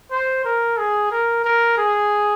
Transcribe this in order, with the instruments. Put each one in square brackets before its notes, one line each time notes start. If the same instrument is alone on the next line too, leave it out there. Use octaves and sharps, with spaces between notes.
[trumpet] C5
A#4
G#4
A#4
A#4
G#4